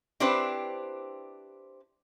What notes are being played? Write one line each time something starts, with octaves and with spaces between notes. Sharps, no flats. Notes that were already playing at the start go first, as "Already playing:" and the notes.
C4 D4 E4 G4 B4 C5